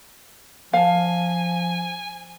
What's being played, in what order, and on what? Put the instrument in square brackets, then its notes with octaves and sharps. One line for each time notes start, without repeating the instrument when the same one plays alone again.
[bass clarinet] F3 [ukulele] F5 A5 [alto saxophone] G#5